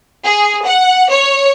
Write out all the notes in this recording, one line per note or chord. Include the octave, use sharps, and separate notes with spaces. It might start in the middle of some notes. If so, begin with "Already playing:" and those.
G#4
F#5
C#5